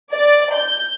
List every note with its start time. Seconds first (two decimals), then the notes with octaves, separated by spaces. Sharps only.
0.13 D5
0.54 G6